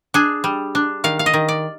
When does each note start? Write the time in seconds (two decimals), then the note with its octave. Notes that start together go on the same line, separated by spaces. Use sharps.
0.14 D4 G#4
0.44 G3
0.75 D4
1.04 D#3 F5
1.19 F5
1.26 D#5
1.34 D#3
1.49 D5